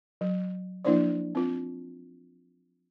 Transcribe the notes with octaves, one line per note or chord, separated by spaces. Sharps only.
F#3
F3 A#3 D4 E4 C5 D5
C4 F4